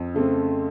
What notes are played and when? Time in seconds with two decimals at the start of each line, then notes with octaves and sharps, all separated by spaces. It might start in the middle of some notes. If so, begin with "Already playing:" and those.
Already playing: F2
0.14 C#3 A3 C4